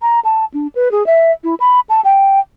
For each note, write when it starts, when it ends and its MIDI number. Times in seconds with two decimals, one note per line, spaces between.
0.02 0.20 82
0.25 0.45 81
0.54 0.67 62
0.75 0.91 71
0.91 1.06 68
1.06 1.32 76
1.44 1.55 64
1.60 1.80 83
1.89 2.01 81
2.05 2.40 79